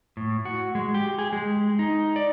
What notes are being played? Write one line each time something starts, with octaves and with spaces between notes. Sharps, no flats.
A2
F#4
G#3
G4
G#4
G#3
D#4
D5